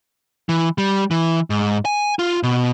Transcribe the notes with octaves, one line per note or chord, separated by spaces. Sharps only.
E3
G3
E3
G#2
G#5
F4
B2